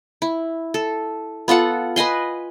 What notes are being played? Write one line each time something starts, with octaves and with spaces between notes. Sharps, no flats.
E4
A4
B3 F4 A4 F#5
B4 D#5 G#5 C6